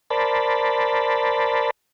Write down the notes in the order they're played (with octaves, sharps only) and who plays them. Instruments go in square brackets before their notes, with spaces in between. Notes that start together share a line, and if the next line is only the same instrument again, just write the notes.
[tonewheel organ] A#4 C5 D5 A5 B5